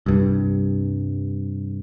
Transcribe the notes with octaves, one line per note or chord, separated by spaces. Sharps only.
C2 G2